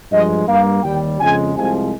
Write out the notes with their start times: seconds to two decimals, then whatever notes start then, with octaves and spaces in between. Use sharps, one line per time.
0.12 G2 F3 G#3 D#5
0.48 G2 G3 A#3 F5
0.84 D#2 D#3 G3 G5
1.20 F2 C#3 G#3 G#5
1.56 C2 C3 F3 G#3 G#5